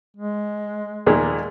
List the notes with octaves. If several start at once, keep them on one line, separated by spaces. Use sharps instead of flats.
G#3
D#2 A#2 G#3